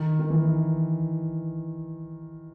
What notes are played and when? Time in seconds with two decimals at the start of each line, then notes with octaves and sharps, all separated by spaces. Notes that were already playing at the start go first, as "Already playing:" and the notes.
Already playing: D#3
0.19 D#3
0.30 E3